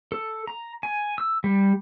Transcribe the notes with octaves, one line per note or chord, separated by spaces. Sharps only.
A4
A#5
G#5
E6
G3